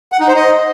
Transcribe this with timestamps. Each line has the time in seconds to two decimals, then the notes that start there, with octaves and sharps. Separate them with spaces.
0.12 F#5
0.20 D#4
0.28 C5
0.36 D#5